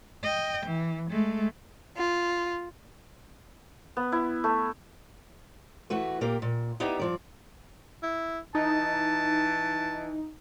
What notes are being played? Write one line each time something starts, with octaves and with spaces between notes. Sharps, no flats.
D#5 G5
E3
G#3 A3
F4
B3
E4
A3
E3 A3 F#4 B4
A#2 A#3 G4
A#2
B3 D#4 E4 G4 D5
G2 F3 D5
E4
E3 D#4 A5